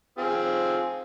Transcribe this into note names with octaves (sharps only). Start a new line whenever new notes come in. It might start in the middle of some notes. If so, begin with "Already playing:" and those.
C4 F4 G#4